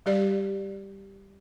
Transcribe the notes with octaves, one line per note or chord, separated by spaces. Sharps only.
G3 G4 D5